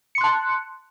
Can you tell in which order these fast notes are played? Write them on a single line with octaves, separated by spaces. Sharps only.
C#7 C6 F#6 A5